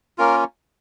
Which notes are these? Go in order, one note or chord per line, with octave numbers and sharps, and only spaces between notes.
A#3 C#4 F4 A#4